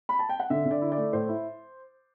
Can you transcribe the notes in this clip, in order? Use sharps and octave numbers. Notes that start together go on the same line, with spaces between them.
B5
A5
G5
F#5
D3 E5
D3
D5
E4
D5
A3
A2 C5
E4